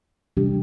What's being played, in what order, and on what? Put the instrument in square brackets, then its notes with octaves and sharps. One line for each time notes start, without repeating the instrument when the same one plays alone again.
[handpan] C3 E3 G3 D4 G4